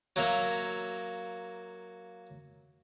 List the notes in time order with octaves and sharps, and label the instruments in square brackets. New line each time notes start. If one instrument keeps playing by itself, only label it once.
[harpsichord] F#3 A#3 A#4 E5